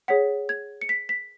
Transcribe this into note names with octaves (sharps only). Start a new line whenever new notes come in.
G#4 C#5 F#5 B6
G#6
C#7
B6
B6